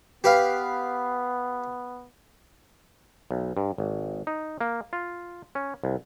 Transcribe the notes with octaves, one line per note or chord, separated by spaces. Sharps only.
B3 G4 B4 F5
B1
G2
G#1
D#4
A#3
F4
C#4
C2